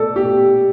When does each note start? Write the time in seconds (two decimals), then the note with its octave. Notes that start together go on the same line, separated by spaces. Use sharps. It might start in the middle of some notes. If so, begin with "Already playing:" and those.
Already playing: A4 D5
0.16 G4